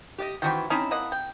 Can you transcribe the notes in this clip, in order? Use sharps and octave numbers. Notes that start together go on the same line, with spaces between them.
G4 D5 D#5
D#3 E3 C4 F#4 G5
C4 C#4 D#4 E4 A5
A#3 D#5 F#5
G5